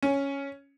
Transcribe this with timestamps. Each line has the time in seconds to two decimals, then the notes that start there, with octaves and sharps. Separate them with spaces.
0.03 C#4